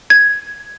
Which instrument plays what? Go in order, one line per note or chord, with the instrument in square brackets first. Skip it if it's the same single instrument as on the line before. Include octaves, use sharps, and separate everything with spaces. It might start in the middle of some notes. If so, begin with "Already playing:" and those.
[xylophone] G#6